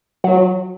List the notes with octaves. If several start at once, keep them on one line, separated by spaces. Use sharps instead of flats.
F#3